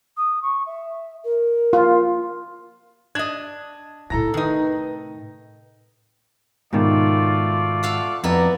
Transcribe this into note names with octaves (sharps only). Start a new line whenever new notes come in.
D#6
C#6
E5
A#4
F4
D4 D#5 G#6
A2 C3 E4 A4 A#5 A#6
D#3 D#4 B4
G#2 B2 D#3 A3 F4 D5
A4 F5 F#5
F2 B3 E4 D5 A#5